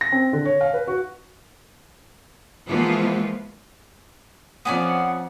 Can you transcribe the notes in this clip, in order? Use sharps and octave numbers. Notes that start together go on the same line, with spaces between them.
A#6
C4
D3
C#5
F5
B4
F#4
E3 F3 G#3 A#3 B3 F4
F2 B3 C#4 D5 F#5